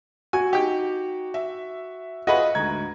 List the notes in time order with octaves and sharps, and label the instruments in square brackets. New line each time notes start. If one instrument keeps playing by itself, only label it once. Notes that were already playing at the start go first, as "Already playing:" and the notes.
[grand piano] F#4 [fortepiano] G#5
[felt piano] D#4 [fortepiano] G4 G5
[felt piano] E5
[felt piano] F4 G#4 E5 [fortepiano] F#4 B4 [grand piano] D#5
[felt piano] D2 G#2 A#5 [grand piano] G#6